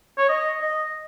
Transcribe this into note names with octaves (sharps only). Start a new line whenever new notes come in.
C#5
D#5
D#5